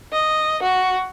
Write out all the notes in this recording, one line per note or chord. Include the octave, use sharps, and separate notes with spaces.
D#5
F#4